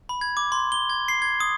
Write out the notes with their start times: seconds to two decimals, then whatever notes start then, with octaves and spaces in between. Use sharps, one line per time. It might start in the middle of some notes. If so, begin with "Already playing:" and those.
0.09 B5
0.21 G#6
0.37 D6
0.52 C6
0.72 G7
0.90 G#6
1.08 C7
1.22 G#6
1.40 D#6